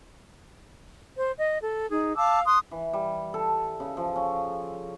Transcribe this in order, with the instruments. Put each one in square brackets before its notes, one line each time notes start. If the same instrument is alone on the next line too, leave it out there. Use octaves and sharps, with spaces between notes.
[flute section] C5
D#5
A4
D#4 G#4
F5 A5 D6 E6
C6 D#6 F#6
[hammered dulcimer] E3
G3
A4
C#3
F3
C#4